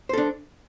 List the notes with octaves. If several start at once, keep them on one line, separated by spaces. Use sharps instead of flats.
D4 A4 C5